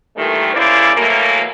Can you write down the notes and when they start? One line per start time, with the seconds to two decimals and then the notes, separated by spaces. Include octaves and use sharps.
0.16 A#2 D#3 E3 G3 A3
0.55 C#3 A#3 C#4 E4 C5 D5
0.96 B2 E3 F#3 A3 A#3